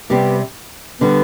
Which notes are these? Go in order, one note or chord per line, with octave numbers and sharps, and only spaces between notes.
C3 G3 B3 C4 G4
D3 G3 B3